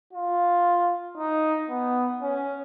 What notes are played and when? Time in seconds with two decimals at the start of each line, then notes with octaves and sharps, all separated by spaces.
0.13 F4
1.18 D#4
1.69 B3
2.22 C#4